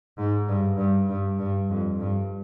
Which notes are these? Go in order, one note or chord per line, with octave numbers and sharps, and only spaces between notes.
G#2
G2
G2
G2
G2
F2
G2